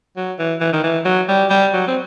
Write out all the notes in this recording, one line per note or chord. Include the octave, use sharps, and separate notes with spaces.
F#3
E3
E3
D#3
E3
F#3
G3
G3
F#3
C4